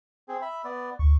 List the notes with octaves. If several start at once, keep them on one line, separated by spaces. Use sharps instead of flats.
C4 G#4
E5 B5
B3 D5
D2 C#6